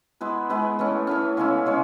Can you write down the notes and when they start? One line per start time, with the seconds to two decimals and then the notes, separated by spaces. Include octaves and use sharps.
0.21 G#3 B3 E4 B4
0.49 G#3 B3 E4 B4
0.79 E3 A3 C#4
1.07 E3 A3 C#4
1.37 C#3 G#3 C#4 E4
1.66 C#3 G#3 C#4